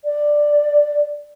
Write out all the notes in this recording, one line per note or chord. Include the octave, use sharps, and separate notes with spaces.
D5